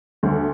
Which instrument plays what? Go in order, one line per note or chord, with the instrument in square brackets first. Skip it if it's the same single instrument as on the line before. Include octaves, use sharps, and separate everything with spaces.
[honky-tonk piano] D2